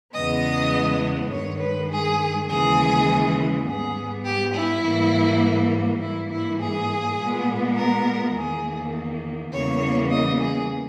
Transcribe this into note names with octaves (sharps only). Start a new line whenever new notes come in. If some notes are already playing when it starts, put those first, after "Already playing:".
E2 C#3 G#3 B3 D#5
G2 D#3 G#3 C#5
B4
G#4
D#2 C#3 E3 G#3 G#4
G#2 G3 B3 G#4
G4
E4
G#2 E3 G3 A#3
G#2 E3 G3 A#3 E4
E4
G#4
A#2 G#3 B3
A#4
E2 D#3 A#3 G#4
E2 C#3 E3 G3 A#3 C#5
D#5
G#4